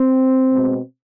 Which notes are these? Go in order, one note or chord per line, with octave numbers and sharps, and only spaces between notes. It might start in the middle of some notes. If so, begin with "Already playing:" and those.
Already playing: C4
B2 G#3